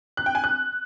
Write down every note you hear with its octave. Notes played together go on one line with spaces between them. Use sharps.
F#6
G5
G#5
F#6